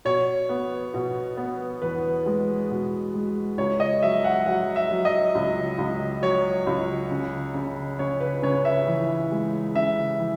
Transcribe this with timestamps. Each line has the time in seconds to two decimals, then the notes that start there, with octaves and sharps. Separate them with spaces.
0.05 B2 C#5
0.49 B3
0.94 B2
1.37 B3
1.82 E2 B4
2.26 G#3
2.70 B2
3.14 G#3
3.58 C#2 C#5
3.80 D#5
4.02 F#3 E5
4.24 F#5
4.46 F#3 F#5
4.76 E5
4.90 F#3
5.05 D#5
5.35 C#2
5.78 C#2
6.22 F#3 C#5
6.67 C#2
7.11 C#3
7.54 C#3
7.99 C#3 C#5
8.20 B4
8.42 C#3 C#5
8.65 E5
8.87 E3
9.31 G#3
9.75 C#3 E5
10.20 E3